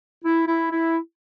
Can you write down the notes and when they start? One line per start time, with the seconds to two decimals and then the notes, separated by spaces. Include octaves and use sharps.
0.24 E4
0.47 E4
0.71 E4